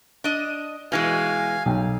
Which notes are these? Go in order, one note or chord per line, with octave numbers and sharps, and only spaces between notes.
D4 D#5
B2 E3 G#3 F5 G#5
B1 G5